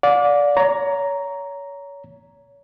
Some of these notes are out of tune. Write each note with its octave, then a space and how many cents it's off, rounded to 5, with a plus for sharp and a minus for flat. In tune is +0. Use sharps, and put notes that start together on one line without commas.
D5 -15 F5 +45
C#5 +30 A#5 +0